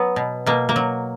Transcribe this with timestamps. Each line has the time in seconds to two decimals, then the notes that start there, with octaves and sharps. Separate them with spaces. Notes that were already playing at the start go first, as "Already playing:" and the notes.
Already playing: F#3 B3
0.16 B2
0.46 B2 A#3
0.69 A#3
0.76 F#3